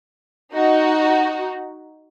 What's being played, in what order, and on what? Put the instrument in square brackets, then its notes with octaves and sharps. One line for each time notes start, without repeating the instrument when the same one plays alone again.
[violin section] D#4 F#4